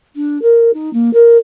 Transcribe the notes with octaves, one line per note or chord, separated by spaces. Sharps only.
D4
A#4
D#4
A#3
A#4